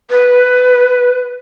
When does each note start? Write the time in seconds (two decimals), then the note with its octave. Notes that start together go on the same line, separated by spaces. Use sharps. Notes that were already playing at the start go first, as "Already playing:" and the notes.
0.10 B4